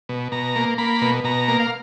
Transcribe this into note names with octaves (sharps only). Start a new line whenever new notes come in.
B2
B2 A#5
A#3
A#3 B5
B2
B2 A#5
A#3
F5